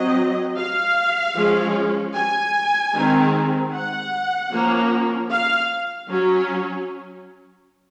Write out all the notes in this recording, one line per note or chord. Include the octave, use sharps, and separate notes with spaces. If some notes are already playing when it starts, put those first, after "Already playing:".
Already playing: F#3 C4 D#5
F5
F3 G#3 C#4
G#5
D#3 G#3 C4
F#5
F3 A#3 C#4
F5
F#3 C#4